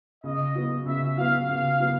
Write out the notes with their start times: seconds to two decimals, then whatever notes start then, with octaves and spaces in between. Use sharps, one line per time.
0.24 C#3 D#5
0.55 F#3 B3
0.86 C#3 E5
1.17 F#3 B3 F5
1.48 C#3 F5
1.80 F#3 B3